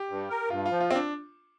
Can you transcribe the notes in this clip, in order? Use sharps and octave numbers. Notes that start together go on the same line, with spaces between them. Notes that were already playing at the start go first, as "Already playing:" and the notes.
Already playing: G4
G2
A#4
G2 F4
F3 F4
F4
C4
D4